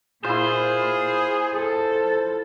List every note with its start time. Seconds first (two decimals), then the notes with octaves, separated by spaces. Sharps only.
0.24 A#2 E4 F4 G#4 C5
1.55 A4